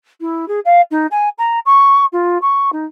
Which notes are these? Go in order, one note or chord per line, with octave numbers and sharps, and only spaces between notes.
E4
G#4
F5
D#4
G#5
A#5
C#6
F4
C#6
D#4